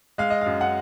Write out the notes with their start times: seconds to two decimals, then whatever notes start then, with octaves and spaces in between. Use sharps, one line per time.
0.18 G#3 F5
0.30 D#5
0.41 F5
0.46 F#2
0.61 F#5